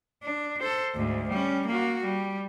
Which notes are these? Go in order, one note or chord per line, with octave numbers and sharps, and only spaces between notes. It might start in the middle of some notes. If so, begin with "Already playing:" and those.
D4
A4 C5
D2 G#2
G3 C#4
A#3 F#4
G3